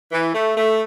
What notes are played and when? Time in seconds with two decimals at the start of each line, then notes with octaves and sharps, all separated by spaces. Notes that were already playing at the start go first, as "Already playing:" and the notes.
0.12 E3
0.34 A3
0.56 A3